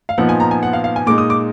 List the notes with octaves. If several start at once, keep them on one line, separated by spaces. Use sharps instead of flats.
F5
A#2 F3 B3 D#4 F#5
G#5
A#5
G#5
F#5
F5
F5
G#5
A#2 G#3 D#4 D6
D#6
D6